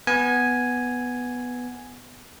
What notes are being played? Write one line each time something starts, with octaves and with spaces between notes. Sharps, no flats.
B3 G#5